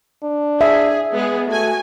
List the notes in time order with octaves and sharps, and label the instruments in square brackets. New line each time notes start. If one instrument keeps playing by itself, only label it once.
[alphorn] D4
[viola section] G#4 [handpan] E5
[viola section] G#3 B3 G#4
[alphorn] A3 [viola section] F#4 G#5